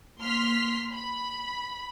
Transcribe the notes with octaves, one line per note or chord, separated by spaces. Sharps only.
A#3 C6 F6 B6
B5